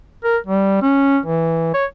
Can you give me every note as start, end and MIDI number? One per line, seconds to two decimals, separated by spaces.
0.24 0.37 70
0.47 0.79 55
0.82 1.18 61
1.26 1.71 52
1.74 1.86 73